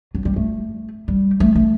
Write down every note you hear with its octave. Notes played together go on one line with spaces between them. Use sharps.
F#3
G3
A3
G3
A3
A3